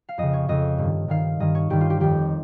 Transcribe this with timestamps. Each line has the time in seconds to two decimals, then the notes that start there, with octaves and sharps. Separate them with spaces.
0.09 F5
0.18 F2 C#3 D#5
0.33 C#5
0.49 F2 C#3 D#5
0.78 G2 D#3
1.08 G2 D#3 F5
1.40 G2 D#3 D#5
1.55 C#5
1.70 G2 D#3 G4
1.81 F4
1.90 G4
2.00 F2 D#3 G4